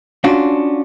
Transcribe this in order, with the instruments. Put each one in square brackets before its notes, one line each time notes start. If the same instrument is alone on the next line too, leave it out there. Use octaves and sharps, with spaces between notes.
[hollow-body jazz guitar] C#4 D4 F4 F#4